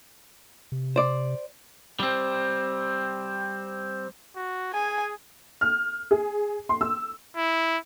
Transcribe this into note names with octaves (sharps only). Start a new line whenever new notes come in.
C3
C5 D5
G3 C4
F#4
G#4 G#5
F6
G#4
C6
E6
E4